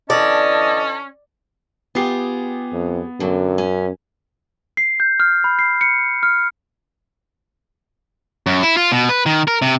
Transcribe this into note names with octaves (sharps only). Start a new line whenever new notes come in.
D3 E3 C#4 D5 D#5 A5
B3 F4 G4 G#4 C7
F2
F#2 D3 F#3
C#4
C7
G6
F6
B5
C7
C#7
F6
F#2
E4
F4
B2
B4
D#3
A#4
C3